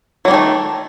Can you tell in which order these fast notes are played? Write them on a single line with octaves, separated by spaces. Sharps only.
F#3 A#3 D#3 A3